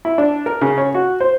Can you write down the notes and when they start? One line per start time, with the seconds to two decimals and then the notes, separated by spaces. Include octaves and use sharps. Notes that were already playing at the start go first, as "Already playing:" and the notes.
0.05 E4
0.18 D4
0.46 A#4
0.61 C#3
0.78 C#5
0.94 F#4
1.20 C5